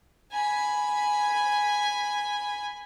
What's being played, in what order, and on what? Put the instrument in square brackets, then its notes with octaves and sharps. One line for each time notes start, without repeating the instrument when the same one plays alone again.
[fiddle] G#5 B5